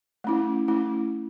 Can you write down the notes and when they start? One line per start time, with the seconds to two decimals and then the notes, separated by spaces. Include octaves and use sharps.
0.24 A3 C#4 E4
0.68 A3 C#4 E4